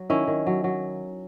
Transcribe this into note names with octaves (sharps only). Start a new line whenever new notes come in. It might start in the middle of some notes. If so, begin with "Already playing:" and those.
Already playing: F#3
D#3 C#4 E4
D#3
F#3
F#3